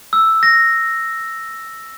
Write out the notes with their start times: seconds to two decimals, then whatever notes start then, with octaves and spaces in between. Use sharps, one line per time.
0.13 E6
0.43 A#6